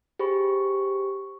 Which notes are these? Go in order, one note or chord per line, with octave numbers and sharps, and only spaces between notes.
G4 G#4 C5 B5 C#6